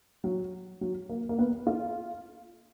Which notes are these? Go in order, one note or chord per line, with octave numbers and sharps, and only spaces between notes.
F#3
F#3
A#3
A#3
B3
F4